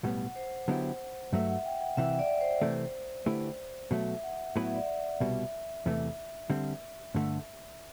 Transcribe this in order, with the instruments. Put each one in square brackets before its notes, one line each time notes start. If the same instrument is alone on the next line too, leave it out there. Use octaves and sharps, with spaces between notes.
[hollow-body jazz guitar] B1 A2 G3 B3 [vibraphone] F#5
[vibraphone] C5
[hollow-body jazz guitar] D3 F#3 B3 E4 G4
[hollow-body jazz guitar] G2 F#3 A3 [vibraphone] E5
[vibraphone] F#5
G5
F#5
[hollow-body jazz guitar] C2 C3 E3 [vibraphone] E5
[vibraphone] D5
C5
[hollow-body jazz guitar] C3 E3 A3 C4
D3 A3 E4 G4 B4
[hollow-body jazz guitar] B2 F#3 A3 [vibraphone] E5
[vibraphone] F#5
[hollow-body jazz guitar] A2 F#3 B3 E4 B4 [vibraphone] F#5
[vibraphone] E5
D5
E5
[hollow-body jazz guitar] C2 B2 G3 [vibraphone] E5
[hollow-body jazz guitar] E2 C3 E3 A3
D3 G3 C4
G2 D3 A3